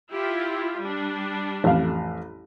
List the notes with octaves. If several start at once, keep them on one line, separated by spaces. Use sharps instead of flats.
E4 F4 G4
G3 D4
A1 F2 F5